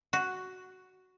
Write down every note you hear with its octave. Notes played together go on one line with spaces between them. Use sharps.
F#4